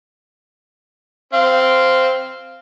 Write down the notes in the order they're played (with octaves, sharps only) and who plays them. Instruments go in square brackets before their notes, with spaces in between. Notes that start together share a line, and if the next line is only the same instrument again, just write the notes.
[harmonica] C4 F5